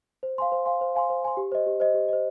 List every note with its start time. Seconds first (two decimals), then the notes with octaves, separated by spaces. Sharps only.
0.23 C5
0.38 F5 G#5 C6
0.52 C5
0.66 F5 G#5 C6
0.81 C5
0.95 F5 G#5 C6
1.10 C5
1.23 F5 G#5 C6
1.37 G4
1.52 C5 D#5
1.67 G4
1.80 C5 D#5
1.94 G4
2.09 C5 D#5